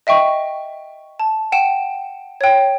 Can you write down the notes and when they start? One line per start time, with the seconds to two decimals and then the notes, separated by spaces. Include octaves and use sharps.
0.07 D#5 E5 G5 C#6
1.20 A5
1.52 F#5 G5 E7
2.41 C#5 G5